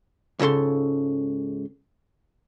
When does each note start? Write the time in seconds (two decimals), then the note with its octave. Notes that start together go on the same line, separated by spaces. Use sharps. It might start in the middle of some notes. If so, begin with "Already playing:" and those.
0.39 C#2 G#2 C#3 A4 C6